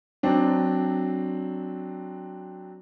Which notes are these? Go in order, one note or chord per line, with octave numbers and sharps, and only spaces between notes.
F#3 C4 D4